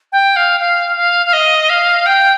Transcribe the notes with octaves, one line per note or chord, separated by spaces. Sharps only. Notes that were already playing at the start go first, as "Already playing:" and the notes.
G5
F5
F5
F5
F5
D#5
F5
G5